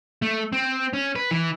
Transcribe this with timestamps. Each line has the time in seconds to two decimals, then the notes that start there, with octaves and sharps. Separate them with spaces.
0.22 A3
0.53 C4
0.93 C#4
1.16 B4
1.31 E3